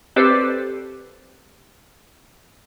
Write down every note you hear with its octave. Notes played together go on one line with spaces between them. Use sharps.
C4 G4 A4 B4 C5 D5